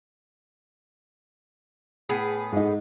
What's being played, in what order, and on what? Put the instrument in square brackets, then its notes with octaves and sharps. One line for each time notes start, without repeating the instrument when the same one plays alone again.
[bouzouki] A2 B3 G#4
[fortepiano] G#2 D#4